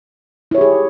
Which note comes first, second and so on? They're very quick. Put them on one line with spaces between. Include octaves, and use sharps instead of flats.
E4 C#5 G4 G#4